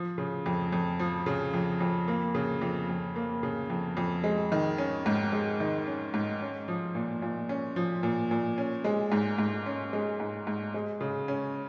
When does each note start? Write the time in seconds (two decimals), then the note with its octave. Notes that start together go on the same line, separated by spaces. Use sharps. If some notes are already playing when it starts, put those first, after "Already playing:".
Already playing: F3
0.18 C#3
0.46 F2
0.72 F2
0.99 F3
1.26 C#3
1.54 F2
1.81 F2
2.08 A#3
2.35 C#3
2.62 F2
2.89 F2
3.16 A#3
3.43 C#3
3.70 F2
3.97 F2
4.24 G#3
4.52 D#3
4.78 C#4
5.06 G#2
5.33 G#3
5.60 D#3
5.87 C#4
6.14 G#2
6.41 C#4
6.68 F3
6.95 A#2
7.22 A#2
7.49 C#4
7.76 F3
8.03 A#2
8.31 A#2
8.58 C#4
8.84 G#3
9.12 G#2
9.38 G#2
9.66 C#4
9.93 G#3
10.20 G#2
10.47 G#2
10.74 G#3
11.01 C#3
11.28 C#4